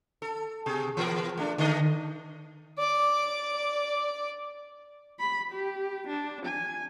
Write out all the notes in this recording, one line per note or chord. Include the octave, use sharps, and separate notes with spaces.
A4
B2 G#4
E3 B3 A#4
A3 D4
D3 A3 D#5
D5 D6
B5
G4
D4
G#5